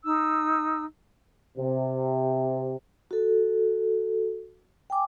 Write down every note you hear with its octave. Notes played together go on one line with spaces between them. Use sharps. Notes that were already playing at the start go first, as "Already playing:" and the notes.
D#4 E6
C3
F#4 A4
G5 G#5 D6